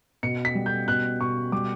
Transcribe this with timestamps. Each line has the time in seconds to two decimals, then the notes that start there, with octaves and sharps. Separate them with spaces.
0.23 B2 C#7
0.45 B6
0.55 G3
0.66 G6
0.88 B2 F#6
1.21 B2 C#6
1.52 G3 D6